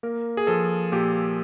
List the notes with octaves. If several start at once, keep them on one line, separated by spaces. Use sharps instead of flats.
A#3 A#4
G#4
F3 A4
A#2 G4